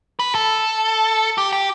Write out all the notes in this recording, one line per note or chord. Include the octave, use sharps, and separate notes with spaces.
B4
A4
G4
G4